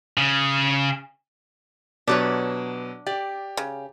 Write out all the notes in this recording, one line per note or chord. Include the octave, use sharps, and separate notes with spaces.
C#3
B2 F#3 D4 G4 B4 C#5
G4 D5
C#3